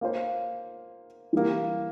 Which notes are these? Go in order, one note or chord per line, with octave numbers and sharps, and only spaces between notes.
A#3 F4 C5
E3 G3 A#3